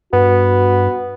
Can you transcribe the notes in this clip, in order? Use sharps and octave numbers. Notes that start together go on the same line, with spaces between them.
G2 B3 F#4